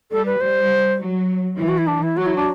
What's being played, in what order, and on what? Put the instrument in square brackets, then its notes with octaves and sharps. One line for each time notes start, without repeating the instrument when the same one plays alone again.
[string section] G3 [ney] A4
[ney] B4
[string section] G3 [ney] C5
[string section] F#3
[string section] E3 [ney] E4
[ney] F#4
E4
D4
E4
[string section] F#3 [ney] F#4
[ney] E4
D4